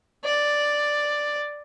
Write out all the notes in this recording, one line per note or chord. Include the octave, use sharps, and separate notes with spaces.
D5